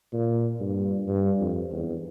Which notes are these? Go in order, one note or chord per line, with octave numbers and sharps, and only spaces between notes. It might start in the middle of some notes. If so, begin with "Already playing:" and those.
A#2
G2
G2
F2
E2